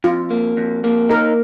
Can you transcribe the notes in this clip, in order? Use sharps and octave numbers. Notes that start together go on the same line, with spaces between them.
F2 F4
A#3
F2
A#3
D#4 A#4